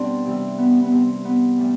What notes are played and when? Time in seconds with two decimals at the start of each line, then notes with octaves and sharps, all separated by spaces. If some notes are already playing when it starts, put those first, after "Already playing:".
Already playing: B2 G3 C4 D4
0.25 C3 E3 G3
0.58 B3
0.83 B3
0.92 C3 G3
1.25 B3
1.58 A2 G3